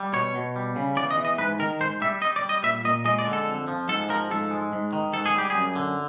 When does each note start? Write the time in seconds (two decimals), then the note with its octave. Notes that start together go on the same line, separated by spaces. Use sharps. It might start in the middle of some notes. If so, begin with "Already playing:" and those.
Already playing: G3
0.13 B2 C#5
0.35 B2
0.56 G3
0.76 C#3
0.96 E2 D5
1.11 D#5
1.17 E3
1.25 D#5
1.38 G#2 B4
1.59 D#3 A#4
1.80 G#2 C5
2.01 G3 E5
2.21 G3 D#5
2.36 D5
2.42 G3
2.49 D#5
2.63 A#2 E5
2.85 A#2 D#5
3.05 G#3 D#5
3.19 D5
3.25 D3
3.33 A4
3.46 F2
3.68 F3
3.89 G#2 A4
4.09 F3 A#4
4.30 G#2 A4
4.51 G#3
4.73 G#2
4.93 D#3
5.13 G#2 A4
5.26 G#4
5.35 G3 G4
5.50 F#2 G#4
5.76 D3